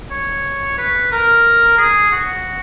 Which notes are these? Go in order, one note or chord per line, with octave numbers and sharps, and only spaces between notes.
C#5
B4
A#4
G#4
F#4